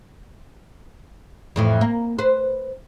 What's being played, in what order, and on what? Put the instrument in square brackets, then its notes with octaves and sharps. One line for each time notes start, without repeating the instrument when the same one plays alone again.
[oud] F2 A2 E3
A#3
B4 C5